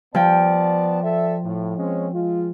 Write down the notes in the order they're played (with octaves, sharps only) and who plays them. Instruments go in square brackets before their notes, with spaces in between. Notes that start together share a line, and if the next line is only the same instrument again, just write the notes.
[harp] F3 G5 [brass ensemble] B3 D5 A5
[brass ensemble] A4 D5 E5
A2
G#3 C4 C#4
G#3 F4